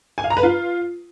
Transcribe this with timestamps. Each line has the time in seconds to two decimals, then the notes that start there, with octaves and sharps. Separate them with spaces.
0.18 G#5
0.24 F5
0.30 A#5
0.37 B4
0.43 F4